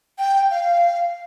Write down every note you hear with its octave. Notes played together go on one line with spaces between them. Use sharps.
G5
F5